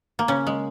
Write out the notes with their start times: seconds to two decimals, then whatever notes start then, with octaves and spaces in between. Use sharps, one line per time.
0.19 A#3
0.28 C#3 C#4
0.47 G#3